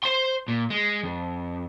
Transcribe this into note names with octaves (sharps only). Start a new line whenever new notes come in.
C5 C6
A#2
G#3
F2